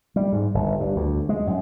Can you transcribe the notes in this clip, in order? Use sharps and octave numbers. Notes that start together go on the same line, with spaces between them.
G3
G#2
G1
G2
D2
G#3
F#2